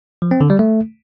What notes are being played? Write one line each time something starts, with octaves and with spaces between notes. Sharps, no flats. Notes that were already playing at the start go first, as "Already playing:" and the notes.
F3
C4
D3
G3
A3